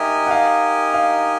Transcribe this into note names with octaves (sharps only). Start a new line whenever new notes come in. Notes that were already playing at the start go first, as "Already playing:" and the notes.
Already playing: D#4 G4 A#4 D#5 E5 G#5
F#5
F5
F5